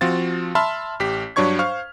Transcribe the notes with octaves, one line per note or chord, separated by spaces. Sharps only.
F3 C4 F4 F#4 A6
E5 A5 B5 C6 F6
A1 G4 B6
G2 F#3 D4 C#5 C#6 G#6
C5 F5 C#6 F6